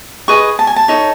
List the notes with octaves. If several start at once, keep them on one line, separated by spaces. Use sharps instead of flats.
G#4 B4 D#5 C#6
A5
G#5
A5
D#4 A4 C#5